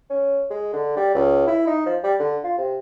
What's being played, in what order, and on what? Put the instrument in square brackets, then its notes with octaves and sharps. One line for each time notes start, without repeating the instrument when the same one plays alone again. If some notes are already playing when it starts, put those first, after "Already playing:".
[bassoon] C#4
G#3
D3
G3
C#2
E4
D#4
F3
G3
D3
F4
C3